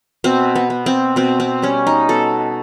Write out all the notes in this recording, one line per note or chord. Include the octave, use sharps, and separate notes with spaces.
B2 C4
B3
B3
C4
B2 C4
C4
G3 C#4
D#4
B2 A4